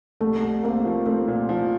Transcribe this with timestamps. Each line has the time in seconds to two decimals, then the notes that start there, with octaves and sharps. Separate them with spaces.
0.21 C2 A3
0.43 C2
0.63 A#3 C4
0.85 F3
1.06 A3 C4
1.27 A#2
1.49 F3